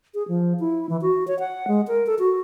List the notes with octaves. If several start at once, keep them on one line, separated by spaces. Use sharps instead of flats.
G#4
F3
E4
E3
F#4
C#5
F#5
G#3
A#4
A4
F#4